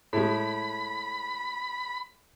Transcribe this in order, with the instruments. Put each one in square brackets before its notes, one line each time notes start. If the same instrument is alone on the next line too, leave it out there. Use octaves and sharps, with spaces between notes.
[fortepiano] A2 G#3 [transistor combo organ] B5